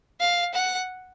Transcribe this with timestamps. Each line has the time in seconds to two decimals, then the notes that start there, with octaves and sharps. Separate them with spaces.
0.20 F5
0.54 F#5